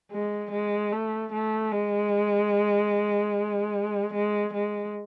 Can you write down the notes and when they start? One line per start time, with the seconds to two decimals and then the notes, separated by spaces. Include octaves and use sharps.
0.11 G#3
0.51 G#3
0.92 A3
1.32 A3
1.72 G#3
4.13 G#3
4.53 G#3